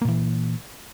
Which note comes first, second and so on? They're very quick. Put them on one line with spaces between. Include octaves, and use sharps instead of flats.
A#3 A#2 E3